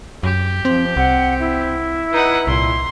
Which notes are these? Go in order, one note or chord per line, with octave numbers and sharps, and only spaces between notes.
F#2 G4
F3 C4
C2 C4 F#5
E4
D#4 B4 F#5
C2 A#2 C6